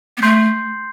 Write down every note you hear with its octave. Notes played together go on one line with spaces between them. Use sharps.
B3
A3 C6 G6 C7